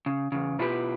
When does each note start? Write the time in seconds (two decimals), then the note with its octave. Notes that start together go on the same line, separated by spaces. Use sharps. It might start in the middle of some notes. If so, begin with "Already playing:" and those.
0.06 C#3
0.32 E2 C#3
0.59 B2 D4 E4 F4 G4 B4